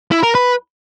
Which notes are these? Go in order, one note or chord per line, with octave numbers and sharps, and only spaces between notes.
E4
A#4
B4